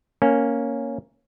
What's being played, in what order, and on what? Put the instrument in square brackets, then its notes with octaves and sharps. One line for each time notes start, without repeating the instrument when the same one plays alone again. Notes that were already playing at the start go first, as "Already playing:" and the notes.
[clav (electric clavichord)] A#3 C#4